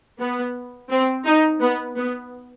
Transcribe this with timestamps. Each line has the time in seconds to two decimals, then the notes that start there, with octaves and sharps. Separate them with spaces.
0.20 B3
0.90 C4
1.26 D#4
1.61 B3
1.96 B3